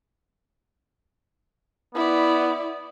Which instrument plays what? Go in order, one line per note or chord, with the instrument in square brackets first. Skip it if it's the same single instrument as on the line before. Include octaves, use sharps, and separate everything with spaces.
[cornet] B3 [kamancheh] E4 D5